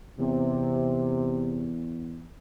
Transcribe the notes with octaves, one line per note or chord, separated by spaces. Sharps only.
E2 C3